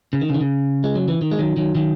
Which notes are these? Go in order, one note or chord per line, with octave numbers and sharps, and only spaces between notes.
C#3
D#3
C#3
D#3
C#3
G#3
F#3
E3
D#3
G#3
D#3 F#3
D#3 F#3
D#3 F#3